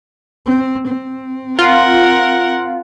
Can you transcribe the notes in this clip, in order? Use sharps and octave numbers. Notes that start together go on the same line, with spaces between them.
C4
C4
F4 A#4 F#5